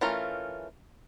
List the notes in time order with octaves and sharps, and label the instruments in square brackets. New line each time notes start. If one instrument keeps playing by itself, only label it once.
[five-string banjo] E3 A3 C#4 F4 A#4